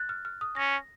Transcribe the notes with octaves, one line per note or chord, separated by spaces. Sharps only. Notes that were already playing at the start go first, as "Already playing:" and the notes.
Already playing: F#6 A6
F6
F6
D#6
C#4 A#6